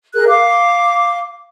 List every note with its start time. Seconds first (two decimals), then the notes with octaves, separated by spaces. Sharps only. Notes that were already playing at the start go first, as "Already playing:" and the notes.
0.14 G#4 A#4 F#6
0.27 F5 D6